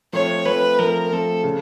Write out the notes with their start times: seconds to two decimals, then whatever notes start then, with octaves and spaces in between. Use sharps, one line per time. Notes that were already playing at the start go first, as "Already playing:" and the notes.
0.13 F3 A3 C4 C#5
0.45 F3 A3 C4 B4
0.79 F3 A3 C4 A#4
1.11 F3 A3 C4 A4
1.44 C#3